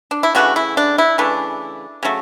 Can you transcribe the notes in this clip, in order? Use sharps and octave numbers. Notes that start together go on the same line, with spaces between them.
D4
E4
C#3 E3 A3 D4 F#4
E4
D4
E4
C#3 E3 A3 D4
C#3 F#3 A3